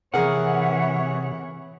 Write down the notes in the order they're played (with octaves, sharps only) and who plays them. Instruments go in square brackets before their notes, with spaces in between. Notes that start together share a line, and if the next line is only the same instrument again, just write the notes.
[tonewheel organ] C3 [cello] E3 C#5 [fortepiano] G#4 A#4 [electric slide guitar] F#5